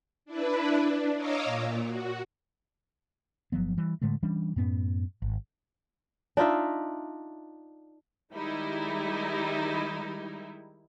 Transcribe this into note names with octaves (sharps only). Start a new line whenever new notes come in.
D4 E4 B4
D4
C#5 D#5 F5 A#5 D6 E6
A#2
F#4
G1 F3 F#3 B3
E3 G3
A2 D3 G#3 A3
E3 G3 C#4 D4
F#2 A2 B3 C#4
G#1
D4 D#4 F4 E5
D#3 G3 G#3 D#4 E4